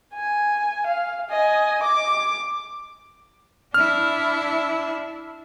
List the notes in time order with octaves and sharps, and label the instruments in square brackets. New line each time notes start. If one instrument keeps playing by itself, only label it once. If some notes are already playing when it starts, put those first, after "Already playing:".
[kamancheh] G#5
F5
D#5 G#5
D6
[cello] D4 E4 [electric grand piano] F6